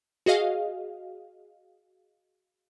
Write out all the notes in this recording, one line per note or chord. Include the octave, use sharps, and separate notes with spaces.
F#4 G#4 D#5 F5